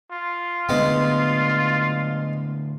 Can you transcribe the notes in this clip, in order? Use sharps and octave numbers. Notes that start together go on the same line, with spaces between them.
F4
A2 D3 G#3 B3